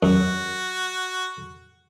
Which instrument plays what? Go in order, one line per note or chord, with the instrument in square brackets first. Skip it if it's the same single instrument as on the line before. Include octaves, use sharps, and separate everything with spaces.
[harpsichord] F#2 [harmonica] F#4